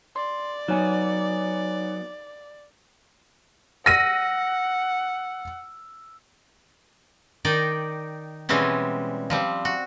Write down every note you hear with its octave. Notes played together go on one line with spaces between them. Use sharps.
D5 C6
F#3 B3 D#4 C#5 G#5
F#5 E6 F6 A#6 D#7
D#3 D#4 D5 G5
B2 E3 G3 G#3 C4 C#4
F3 G3 C4
F#4